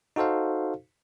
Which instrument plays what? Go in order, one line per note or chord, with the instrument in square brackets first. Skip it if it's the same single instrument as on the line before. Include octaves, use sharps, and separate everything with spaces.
[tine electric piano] D#4 F#4 A4 C5 F5